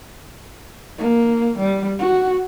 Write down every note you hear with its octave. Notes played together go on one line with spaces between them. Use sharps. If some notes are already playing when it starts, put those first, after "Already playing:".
A#3
G3
F#4